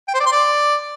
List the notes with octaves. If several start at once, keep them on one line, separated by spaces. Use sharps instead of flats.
G5
C5
D5
C6
D5